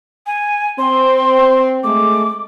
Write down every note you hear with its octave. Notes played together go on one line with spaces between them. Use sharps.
G#5
C4 C6
G#3 A3 D6